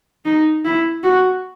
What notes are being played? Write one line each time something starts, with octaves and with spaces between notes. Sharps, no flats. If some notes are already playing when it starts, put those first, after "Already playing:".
D#4
E4
F#4